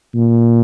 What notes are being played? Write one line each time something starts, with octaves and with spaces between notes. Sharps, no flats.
A#2